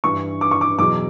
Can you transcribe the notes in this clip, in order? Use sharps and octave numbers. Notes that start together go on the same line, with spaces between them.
G2 E3 C#6
D6
C#6
D6
E2 B2 F#3 D6